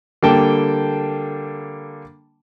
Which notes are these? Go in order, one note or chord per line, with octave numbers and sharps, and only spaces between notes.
D3 G3 A#3 G5 A5